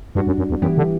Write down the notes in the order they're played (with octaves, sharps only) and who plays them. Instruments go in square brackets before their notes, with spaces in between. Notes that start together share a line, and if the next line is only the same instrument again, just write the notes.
[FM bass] G2 [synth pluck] G3 D4 F#4
[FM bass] F#2
F#2
E2
[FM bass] F#2 [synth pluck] E3 B3 E4 G4
[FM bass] D3